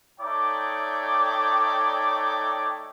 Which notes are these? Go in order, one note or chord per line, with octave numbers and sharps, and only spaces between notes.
A3 D#4 C#5 D5 G5 D6